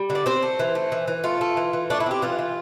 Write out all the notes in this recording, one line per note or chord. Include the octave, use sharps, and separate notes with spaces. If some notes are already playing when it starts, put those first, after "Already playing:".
Already playing: G3
D3
D5
C4 C5
A3
E3
A3
E3
E3
A3 F4
A3
E3
E3
A3 D4
E4
C4 G4
E3 F4
E3